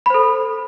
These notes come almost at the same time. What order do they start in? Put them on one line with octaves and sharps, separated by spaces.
B5 C5 A4